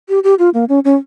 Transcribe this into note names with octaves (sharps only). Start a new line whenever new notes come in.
G4
G4
F4
A#3
C#4
C#4